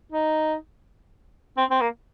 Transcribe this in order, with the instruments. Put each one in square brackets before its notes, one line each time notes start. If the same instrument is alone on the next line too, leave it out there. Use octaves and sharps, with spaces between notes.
[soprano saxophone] D#4
C4
C4
A#3